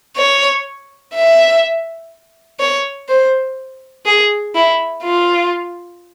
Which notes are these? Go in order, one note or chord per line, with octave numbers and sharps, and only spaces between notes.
C#5
E5
C#5
C5
G#4
E4
F4